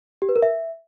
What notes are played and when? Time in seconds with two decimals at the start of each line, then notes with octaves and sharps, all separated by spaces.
0.22 G4
0.29 B4
0.36 A#4
0.42 E5